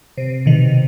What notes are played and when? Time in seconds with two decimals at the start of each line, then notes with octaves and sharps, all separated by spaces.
0.17 C3
0.46 B2 D#3